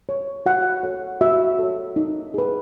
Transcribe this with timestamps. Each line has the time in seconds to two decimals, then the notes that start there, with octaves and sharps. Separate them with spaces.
0.09 C#5
0.46 F#4 F#5
0.83 A4 C#5
1.21 F#4 E5
1.59 A4 C#5
1.96 D#4
2.34 G#4 B4